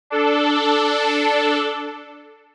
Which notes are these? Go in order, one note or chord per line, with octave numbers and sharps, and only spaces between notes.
D4 A4